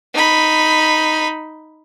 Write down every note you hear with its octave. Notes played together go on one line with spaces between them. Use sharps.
D#4 B5